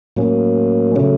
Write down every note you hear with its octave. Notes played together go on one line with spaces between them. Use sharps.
A2 F#3 A#3 C#4
C#3 F#3 A3 C#4